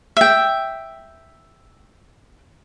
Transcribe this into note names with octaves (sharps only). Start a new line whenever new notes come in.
E5 G5